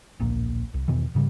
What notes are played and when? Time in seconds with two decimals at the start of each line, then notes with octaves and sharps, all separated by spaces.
0.20 D1 A#1 A#2
0.74 C2
0.88 E2 B2 D#3 E3
1.15 G#2 C#3 F3 G3